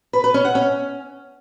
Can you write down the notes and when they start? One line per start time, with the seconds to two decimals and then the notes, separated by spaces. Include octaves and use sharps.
0.13 B4
0.24 B4
0.34 C#4
0.45 F#5
0.55 C#4